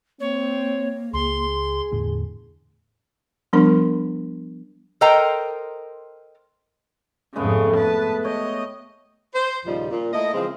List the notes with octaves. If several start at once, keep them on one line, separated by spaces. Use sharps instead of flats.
A#3 C4 C#5
C#2 G#4 C6
E2 A2 D3
F3 G3 B3 D4 A#4 C6
A4 A#4 C5 D#5 G5 A#5
F2 G#2 C#3 G#3 A3 B3
B4 A5
C#5 D#5 G5
C5
D#2 A#2 C#3 F3 G3 D#4
A#2
A3 A#3 E4 D#5
C#3 E3 F3 G#3 C4